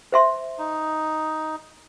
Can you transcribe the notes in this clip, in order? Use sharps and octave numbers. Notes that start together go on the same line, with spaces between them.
C5 E5 C6
D#4